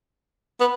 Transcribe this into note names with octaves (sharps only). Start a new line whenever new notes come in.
B3